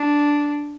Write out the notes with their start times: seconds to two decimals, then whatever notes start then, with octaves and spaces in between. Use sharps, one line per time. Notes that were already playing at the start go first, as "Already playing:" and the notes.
Already playing: D4